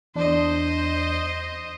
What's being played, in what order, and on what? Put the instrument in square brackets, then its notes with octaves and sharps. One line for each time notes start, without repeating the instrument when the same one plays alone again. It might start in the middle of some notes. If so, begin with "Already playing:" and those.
[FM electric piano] E2 D4 [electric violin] C5 D#5